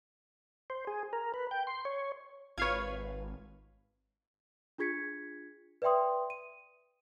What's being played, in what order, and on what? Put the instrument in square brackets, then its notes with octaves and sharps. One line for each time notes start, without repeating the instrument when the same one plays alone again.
[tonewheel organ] C5
G#4
A#4
B4
G5
C6
C#5
[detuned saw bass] G#1 [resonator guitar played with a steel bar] F4 B4 [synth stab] C#5 F5 G#6
[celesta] D4 F4 G#4 G#6 B6 C#7
B4 D5 E5 G5 C6 D#6
D#7